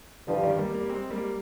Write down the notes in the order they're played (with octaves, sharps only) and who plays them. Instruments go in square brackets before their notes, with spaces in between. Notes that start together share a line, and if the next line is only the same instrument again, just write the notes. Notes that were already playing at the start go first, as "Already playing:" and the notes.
[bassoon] G2 [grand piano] D3 F3
[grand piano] D#3 G3
G3 A#3
G3 A#3
G#3 C4
G3 A#3